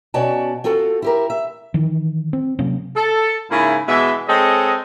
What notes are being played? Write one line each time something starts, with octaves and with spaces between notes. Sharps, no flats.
B2 C#4 F#4 D5 G5 A5
C4 F4 F#4 A4
E4 G4 A#4
E5
D#3 E3
C4
C3 F#3 A#3 C#4
A4
G#2 C#3 A#3 E4
B2 E3 G#3 E5
G#3 C4 A4 C#5 D#5